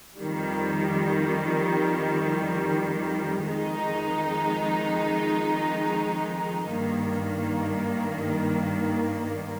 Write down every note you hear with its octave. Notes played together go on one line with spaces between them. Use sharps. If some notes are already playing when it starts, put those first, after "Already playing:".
F2 D#3 G3
F2 D#3 G#3 D#4
G2 D#3 A#3